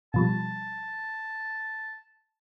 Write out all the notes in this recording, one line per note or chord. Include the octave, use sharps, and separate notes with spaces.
B2 F3 G3 A5